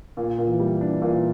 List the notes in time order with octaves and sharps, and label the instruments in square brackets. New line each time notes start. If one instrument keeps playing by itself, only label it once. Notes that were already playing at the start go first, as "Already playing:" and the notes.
[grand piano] A#2
A#2
[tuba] E3
[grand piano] G3
D4
A#2